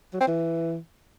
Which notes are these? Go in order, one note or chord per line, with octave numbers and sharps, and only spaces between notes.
F#3
C4
E3